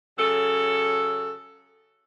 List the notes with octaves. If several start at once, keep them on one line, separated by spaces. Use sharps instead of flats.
C#3 F#3 A4